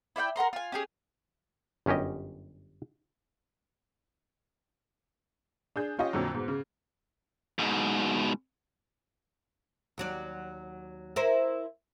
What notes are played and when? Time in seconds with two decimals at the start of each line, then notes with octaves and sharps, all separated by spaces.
0.16 E4 D5 F5 G5
0.36 A#4 F#5 A#5 C6
0.53 F4 G#5
0.72 C#4 G4 G#4
1.86 G1 F#2 C#4 G4 D#5
5.76 D4 G#4 G6
5.99 C#4 F4 G4 D#5
6.13 F2 A#2 D3 F#3
6.34 G#2 B2
6.48 C#3
7.59 G#2 B2
9.98 D#2 F#3 D5
11.16 E4 A#4 C5